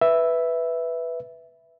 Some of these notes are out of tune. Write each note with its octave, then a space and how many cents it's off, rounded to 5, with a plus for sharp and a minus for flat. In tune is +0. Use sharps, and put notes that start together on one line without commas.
B4 +0 E5 +0